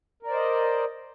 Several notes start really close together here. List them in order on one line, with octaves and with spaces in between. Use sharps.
A#4 D5 C5 D#5